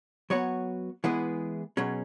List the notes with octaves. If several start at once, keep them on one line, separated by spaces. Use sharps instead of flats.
F#3 B3 F#4 C#5
E3 G#3 B3 E4 G#4
B2 F#3 C#4 G#4